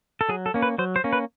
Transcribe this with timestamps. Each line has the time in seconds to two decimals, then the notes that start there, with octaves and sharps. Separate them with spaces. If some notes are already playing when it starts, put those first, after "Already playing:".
0.21 A4
0.29 F#3 G#4
0.46 A4
0.54 A#3 C#4
0.62 B4
0.78 F#3 C5
0.96 C5
1.04 A#3 C#4
1.13 B4